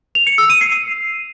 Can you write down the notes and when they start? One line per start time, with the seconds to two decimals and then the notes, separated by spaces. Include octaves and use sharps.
0.15 F7
0.27 C#7
0.38 E6
0.50 D#7
0.61 C7